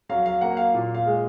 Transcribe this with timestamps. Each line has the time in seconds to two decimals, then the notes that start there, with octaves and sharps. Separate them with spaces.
0.09 F#3 F5
0.26 F5
0.41 A#3 F#5
0.57 F5
0.74 A#2
0.94 F5
1.06 G#3